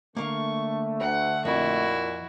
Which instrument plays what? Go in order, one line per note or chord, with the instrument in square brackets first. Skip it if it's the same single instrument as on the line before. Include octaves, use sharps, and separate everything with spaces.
[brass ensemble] D3 A3 [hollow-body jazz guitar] A#3 F5 [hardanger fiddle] C#6
[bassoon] D2 [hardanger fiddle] F#5
[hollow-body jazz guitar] F2 [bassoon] A#2 [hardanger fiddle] E4 F#4